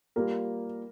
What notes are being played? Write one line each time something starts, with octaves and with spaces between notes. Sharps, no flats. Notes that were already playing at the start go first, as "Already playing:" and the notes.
G3 A#3 F4 A#4